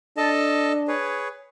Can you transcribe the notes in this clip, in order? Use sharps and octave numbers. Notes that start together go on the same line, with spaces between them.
D4 A4 D#5 A5
G#4 B4 C#5